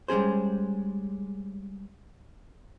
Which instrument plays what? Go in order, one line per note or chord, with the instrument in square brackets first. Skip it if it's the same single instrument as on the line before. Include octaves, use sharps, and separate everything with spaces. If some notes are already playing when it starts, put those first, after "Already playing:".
[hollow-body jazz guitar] G3 G#3 C#4 G#4 C5